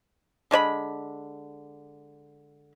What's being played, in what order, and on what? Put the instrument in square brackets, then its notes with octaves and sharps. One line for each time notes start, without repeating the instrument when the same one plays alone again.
[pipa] D3 G#3 C#5 B5